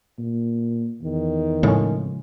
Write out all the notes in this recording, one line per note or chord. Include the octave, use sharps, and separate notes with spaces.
A#2
E2 D#3
A2 C#3 F3 G#3 C#4